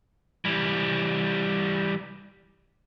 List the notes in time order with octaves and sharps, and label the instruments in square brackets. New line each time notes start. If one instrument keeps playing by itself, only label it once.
[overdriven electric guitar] E3 G3